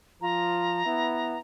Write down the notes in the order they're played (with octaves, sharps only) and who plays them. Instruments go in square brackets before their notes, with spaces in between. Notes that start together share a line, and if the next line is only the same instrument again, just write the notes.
[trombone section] F3 F4 [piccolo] A#5
[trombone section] B3 E4